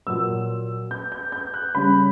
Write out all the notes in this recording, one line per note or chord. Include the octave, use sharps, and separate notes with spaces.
A#2 F#3 E6
G6
G6
G6
F#6
C#3 G3 B5